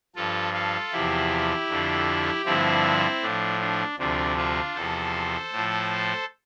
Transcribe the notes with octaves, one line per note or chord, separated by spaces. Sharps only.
G2 F3 F4 A4
F4 A4
E2 C3 F3 E4 G4
F2 D3 F3
G2 D3 F3 C4 E4
A2 F3 D4
D4
D2 C3 F3 D4
D4 F4
E2 C3 F3 A4 C5
A2 F3